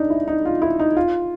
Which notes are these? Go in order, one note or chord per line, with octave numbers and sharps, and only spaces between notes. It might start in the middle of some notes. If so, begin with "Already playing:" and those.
Already playing: D4 D#4
E4
D#4
F4
E4
D#4
F4